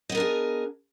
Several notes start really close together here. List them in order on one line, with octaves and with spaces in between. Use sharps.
D#5 B3 A#4 D4 G#4